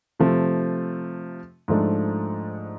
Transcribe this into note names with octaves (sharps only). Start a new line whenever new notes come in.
C3 F3 A3
G#2 F3 A3 D4